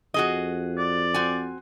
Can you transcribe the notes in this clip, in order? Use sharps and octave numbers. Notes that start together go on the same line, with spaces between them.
F2 F#4 G#4 D#5
D5
C4 F#4 G#5